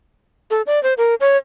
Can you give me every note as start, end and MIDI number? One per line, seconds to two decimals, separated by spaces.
0.51 0.62 69
0.67 0.82 74
0.83 0.94 72
0.98 1.15 70
1.21 1.37 73